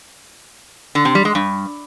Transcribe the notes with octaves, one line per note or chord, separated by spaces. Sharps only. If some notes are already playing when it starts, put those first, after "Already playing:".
D3
C3
G3
G#3
G2